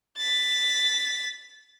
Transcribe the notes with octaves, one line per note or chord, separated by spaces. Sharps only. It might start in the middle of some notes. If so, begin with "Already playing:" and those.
A6 B6